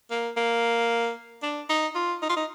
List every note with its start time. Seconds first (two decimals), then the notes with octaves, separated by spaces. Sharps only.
0.11 A#3
0.37 A#3
1.43 D4
1.69 D#4
1.95 F4
2.22 D#4
2.30 F4
2.36 D#4